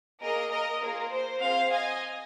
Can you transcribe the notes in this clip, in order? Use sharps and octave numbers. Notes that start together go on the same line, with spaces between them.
A#3 G#4 A#4 D#5
A#4 D#5
A#3 F4 G#4 A#4
C5
C4 F4 G#4 C5 F5
D#5 G#5